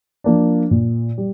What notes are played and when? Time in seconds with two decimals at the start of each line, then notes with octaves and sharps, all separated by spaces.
0.24 F3 A#3 D4
0.71 A#2
1.18 G3